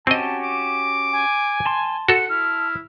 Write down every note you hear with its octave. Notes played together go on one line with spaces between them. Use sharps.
C4 C#4 F#4 G4 D#5 A5
D6
G#5
A5 C6
F#4 A4 F#5 C#7
E4 F6